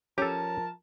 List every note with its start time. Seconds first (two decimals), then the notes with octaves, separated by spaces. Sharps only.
0.18 F3 C#4 G4 A4 A#4 A5